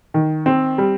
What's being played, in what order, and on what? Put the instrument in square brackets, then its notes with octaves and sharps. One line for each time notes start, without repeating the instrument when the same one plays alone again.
[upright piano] D#3
C4
G3